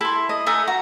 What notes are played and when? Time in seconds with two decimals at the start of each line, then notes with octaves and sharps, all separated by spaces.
0.01 E4 A4 C6
0.29 D#5
0.47 A3 G#5 A#5
0.68 F#4 A#5